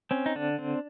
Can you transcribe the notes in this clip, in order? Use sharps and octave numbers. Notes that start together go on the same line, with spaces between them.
C4 C#4
D#4
D3 D4
C4